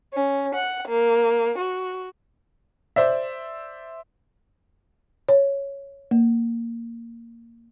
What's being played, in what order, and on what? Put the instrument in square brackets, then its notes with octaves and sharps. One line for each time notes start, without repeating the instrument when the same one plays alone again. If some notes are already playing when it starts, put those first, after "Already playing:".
[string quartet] C#4
F#5
A#3
F#4
[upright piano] C5 D5 E5
[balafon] C#5
A#3